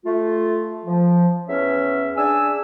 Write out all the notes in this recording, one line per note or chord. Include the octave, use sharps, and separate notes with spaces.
A3 F4
F3
E2 C#4 C#5 E5
D4 G#4 G#5 E6